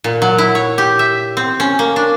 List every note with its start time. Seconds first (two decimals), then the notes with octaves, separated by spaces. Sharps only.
0.04 A#2
0.22 F#3
0.38 E4
0.55 C#5
0.78 G4
0.99 E5
1.37 C4
1.60 C#4
1.79 A#3
1.96 D4